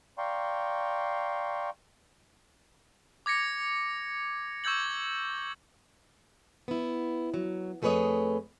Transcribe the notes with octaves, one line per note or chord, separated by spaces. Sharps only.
D5 F5 G5 A#5 C6 C#6
D6 G#6 A#6 C#7
C#6 E6 G6 G#6 F#7
B3 E4
F#3
F2 A3 G#4 B4 C#5 D#5